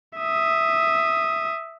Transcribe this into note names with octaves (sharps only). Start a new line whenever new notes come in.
E5 D#6